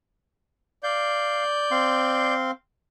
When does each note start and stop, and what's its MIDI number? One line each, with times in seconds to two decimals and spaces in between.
0.83 2.34 74
0.83 1.44 77
0.83 2.34 91
1.71 2.51 60
1.71 2.51 77
1.71 2.51 84